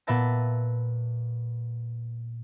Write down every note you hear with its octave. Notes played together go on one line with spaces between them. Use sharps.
A#2 B3 B4 E5 A5 A#6